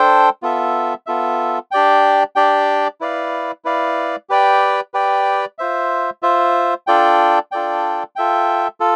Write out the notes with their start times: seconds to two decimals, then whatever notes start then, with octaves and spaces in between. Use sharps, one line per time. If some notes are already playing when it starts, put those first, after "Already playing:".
Already playing: D4 A4 C5 G5
0.43 B3 F4 A4 E5
1.06 B3 F4 A4 E5
1.71 D4 G4 D5 G5
2.36 D4 G4 D5 G5
3.01 E4 B4 D5 F5
3.65 E4 B4 D5 F5
4.29 G4 B4 D5 G5
4.94 G4 B4 D5 G5
5.58 F4 C5 E5
6.22 F4 C5 E5
6.87 D4 F4 A4 D5 G5
7.51 D4 F4 A4 D5 G5
8.16 F4 A4 E5 G5
8.80 F4 A4